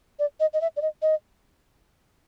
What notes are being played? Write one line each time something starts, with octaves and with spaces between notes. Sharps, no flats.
D5
D#5
D#5
E5
D5
D#5
D#5